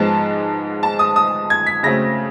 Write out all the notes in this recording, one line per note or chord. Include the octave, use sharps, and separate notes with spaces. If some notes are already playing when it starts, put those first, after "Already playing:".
Already playing: G#2 F3 G#3 B3 A5
A5
D#6
D#6
G#6
B6
C#3 F#3 A3 C4 A#6